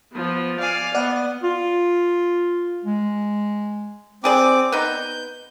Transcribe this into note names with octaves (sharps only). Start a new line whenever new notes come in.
F3 B3
D5 F5 G#5
B3 D5 F#5
F4
G#3
C4 G4 G#4 D5 D6
B3 D#4 G6